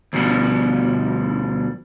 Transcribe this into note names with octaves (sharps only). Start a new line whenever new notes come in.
D2 B2 F3 G3